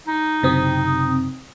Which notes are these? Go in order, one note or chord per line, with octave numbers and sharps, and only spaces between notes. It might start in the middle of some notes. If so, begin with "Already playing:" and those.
D#4
F#1 C3 C4 D#6